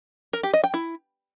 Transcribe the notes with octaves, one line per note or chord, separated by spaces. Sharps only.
A#4
G4
D#5
G5
E4